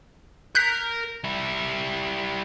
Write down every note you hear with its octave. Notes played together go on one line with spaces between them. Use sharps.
A#4 A#5 F#6 G6 B6
G3 E4